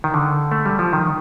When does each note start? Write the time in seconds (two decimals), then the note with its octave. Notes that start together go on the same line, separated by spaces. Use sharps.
0.04 D#3
0.14 D3
0.52 A3
0.66 G3
0.79 F3
0.93 D#3